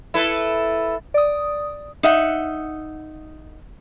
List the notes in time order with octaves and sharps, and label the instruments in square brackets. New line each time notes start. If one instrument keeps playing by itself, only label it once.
[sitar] E4 A4 B4
[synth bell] D5 D#6
[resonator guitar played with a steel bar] D#4 E5 F#5